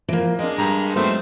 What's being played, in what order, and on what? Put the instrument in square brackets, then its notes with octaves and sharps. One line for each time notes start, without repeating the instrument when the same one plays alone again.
[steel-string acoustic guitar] E3 A#3 [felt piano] F3
[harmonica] G#3 A#3 [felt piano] D4 D#5 [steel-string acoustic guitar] D5
[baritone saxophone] G2 [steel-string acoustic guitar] A#5
[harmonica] D#3 C4 C5 [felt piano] F#3 G#3 B3 [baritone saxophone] A3